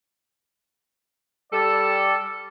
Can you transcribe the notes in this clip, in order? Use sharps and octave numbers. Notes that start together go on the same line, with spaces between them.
G3 A4 D5